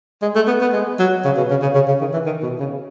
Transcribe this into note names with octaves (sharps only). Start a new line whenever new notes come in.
G#3
A3
B3
B3
G#3
F#3
C#3
B2
C#3
C#3
C#3
C#3
D#3
E3
D#3
B2
C#3